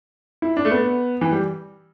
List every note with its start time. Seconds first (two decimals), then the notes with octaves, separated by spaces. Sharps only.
0.42 E4
0.57 D4
0.65 A3
0.71 B3
1.21 E3
1.32 G3